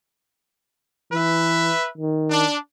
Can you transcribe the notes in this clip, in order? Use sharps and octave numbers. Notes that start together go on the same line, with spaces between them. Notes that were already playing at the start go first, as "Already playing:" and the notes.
E3 B4 E5
D#3
D4